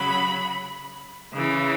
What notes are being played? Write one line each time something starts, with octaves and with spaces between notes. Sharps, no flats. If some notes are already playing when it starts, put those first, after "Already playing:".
Already playing: C#3 F#3 B5
C#3 E3